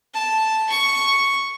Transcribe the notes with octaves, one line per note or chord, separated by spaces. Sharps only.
A5
C#6